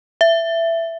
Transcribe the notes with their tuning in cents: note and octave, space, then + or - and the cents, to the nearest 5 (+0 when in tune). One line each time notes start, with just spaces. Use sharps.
E5 +10